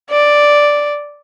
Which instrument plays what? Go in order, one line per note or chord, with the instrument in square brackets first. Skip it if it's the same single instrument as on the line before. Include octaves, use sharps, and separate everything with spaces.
[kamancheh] D5